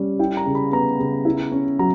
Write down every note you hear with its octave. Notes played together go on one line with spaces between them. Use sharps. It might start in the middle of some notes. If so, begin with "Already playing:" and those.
Already playing: G3 C#4
E4 G5
A#5
C#3
B5
B3 A#5
C#3
E4
C#4
F#3 A#5